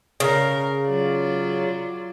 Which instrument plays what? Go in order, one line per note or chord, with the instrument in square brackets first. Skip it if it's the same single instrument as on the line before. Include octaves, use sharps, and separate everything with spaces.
[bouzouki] C#3 [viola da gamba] A#4
[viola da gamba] F#3 F4 D5